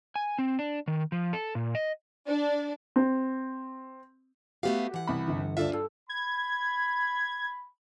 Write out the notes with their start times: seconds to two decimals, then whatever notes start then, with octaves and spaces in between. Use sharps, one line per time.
0.16 G#5
0.39 C4
0.59 D4
0.87 D#3
1.12 F3
1.33 A4
1.55 A#2
1.75 D#5
2.27 D4
2.96 C4
4.63 A3 B3 F#4 G4 F5
4.94 E3 F#5
5.07 C2 B5
5.28 G1 D3
5.57 D2 D4 F4 A4 E5
5.73 G2 A4
6.09 B5 G#6